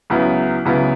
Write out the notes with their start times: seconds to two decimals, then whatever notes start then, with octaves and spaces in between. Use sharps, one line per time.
0.10 C#2 C#3 F#3 B3 E4
0.65 C#2 C#3 F#3 B3 E4